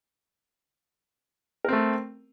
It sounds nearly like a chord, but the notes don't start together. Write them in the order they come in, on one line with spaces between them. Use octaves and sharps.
A#4 C4 A3